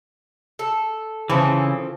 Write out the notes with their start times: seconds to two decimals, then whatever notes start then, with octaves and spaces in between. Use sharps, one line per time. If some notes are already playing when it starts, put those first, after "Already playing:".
0.59 A4
1.29 C#3 E3 F3 C4 A4